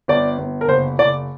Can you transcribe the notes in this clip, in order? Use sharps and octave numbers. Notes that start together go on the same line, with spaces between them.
G1 D5
G1
A#4
F#1 C5
F#1 D5